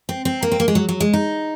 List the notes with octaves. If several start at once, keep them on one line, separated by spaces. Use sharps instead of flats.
C4
C4
A#3
C4
A#3
G#3
F#3
F#3
G#3
D#4